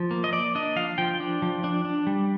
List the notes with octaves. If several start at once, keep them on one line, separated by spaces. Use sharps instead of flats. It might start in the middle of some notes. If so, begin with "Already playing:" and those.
Already playing: F3
A#3
D#5
A#3 D5
D4 D#5
F3 F5
F3 G5
D4
F3
D4
D4
G3